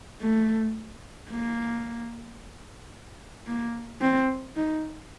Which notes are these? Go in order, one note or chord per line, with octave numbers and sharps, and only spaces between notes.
A3
A#3
A#3
C4
D#4